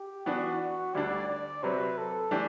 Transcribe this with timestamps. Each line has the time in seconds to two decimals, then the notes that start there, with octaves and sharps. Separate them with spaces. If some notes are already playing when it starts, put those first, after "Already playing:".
Already playing: G4
0.26 E3 B3 D4 F#4
0.60 F#4
0.94 D2 D3 G3 D4 D5
1.29 D5
1.63 C3 F#3 C4 B4
1.98 A4
2.31 E3 A3 D4 G4